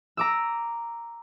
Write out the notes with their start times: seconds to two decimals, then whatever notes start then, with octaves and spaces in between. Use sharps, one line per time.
0.17 A#5 D6 E6